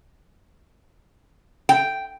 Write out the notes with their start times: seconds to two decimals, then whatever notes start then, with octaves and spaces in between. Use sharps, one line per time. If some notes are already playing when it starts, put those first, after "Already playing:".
1.69 G5